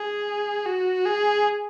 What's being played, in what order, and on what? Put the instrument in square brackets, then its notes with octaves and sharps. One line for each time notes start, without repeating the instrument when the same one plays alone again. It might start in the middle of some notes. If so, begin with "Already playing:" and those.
Already playing: [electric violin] G#4
F#4
G#4